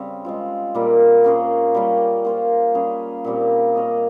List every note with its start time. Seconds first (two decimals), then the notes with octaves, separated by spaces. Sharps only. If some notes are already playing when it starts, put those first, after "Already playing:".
Already playing: C#3 G3 C4
0.25 G#3 C4 F4
0.75 A#2 G3 A#3 F4
1.24 A#3 C#4 G#4 C5
1.74 G3 A#3 C#4
2.25 A#3 F4 C5
2.74 G3 C#4 G#4
3.24 A#2 G3 C4 G4
3.74 A#3 C#4 G#4 D#5